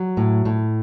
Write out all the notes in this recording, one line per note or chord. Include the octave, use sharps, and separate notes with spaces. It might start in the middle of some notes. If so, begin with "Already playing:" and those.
Already playing: F#3
A2
A2